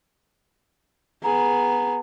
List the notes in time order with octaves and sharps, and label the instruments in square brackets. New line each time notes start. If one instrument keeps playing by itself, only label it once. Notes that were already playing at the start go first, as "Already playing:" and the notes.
[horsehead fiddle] B3 G#4 [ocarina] A#5